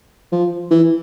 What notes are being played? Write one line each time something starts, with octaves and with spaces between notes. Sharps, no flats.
F3
E3